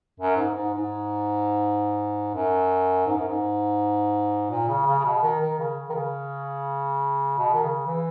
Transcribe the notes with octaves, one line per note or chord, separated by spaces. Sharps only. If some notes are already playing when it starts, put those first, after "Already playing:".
F#2
G#2
G#2
G#2
F#2
G#2
F#2
G#2
A#2
C#3
C#3
C#3
B2
D#3
D#3
C#3
D#3
C#3
B2
D#3
C#3
E3